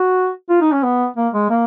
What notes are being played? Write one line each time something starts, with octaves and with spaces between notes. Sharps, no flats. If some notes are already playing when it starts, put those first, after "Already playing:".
Already playing: F#4
F4
D#4
C#4
B3
A#3
G#3
A#3